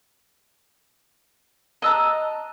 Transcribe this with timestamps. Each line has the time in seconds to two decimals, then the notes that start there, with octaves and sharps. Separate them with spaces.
1.82 D#5 A5 A#5 E6 F#6